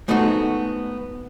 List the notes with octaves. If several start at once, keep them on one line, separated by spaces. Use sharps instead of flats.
G#3 A3 B3 C4 D#4 F#4